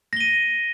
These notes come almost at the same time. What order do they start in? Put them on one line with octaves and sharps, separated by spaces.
A#6 G7 D#7